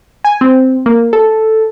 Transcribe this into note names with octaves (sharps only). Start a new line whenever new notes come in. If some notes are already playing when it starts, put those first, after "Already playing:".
G#5
C4
A#3
A4